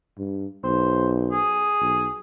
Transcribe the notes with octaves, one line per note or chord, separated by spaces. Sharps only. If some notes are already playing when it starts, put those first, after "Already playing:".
G2
B1 C5
G#4
B1